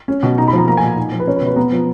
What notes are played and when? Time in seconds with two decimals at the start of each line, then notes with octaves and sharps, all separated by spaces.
0.08 C#4
0.23 B2
0.38 D#4 A#5
0.48 B5
0.53 F3 A#5
0.68 A#3 A#5
0.77 A#2 G#5
0.97 D#4
1.12 F3
1.20 B4
1.27 C#4 C#5
1.36 B4
1.41 B2
1.47 B4
1.56 B3 A#5
1.72 F3